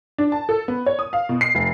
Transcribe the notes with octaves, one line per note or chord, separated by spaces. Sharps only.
D4
A5
A4
B3
C#5
D#6
F5
B2
C7
F1